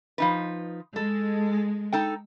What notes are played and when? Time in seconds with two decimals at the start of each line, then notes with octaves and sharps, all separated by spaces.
0.18 F3 D#4 B4
0.96 G#3 A4
1.92 D#4 A4 G5